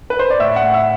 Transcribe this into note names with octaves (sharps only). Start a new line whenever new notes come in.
B4
C5
D5
A2 E5
F#5
A2
E5